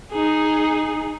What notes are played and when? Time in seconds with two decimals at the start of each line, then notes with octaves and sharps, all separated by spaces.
0.12 D#4 G#4